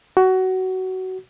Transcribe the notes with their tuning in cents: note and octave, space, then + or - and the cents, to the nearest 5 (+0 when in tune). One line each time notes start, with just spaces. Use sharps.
F#4 +20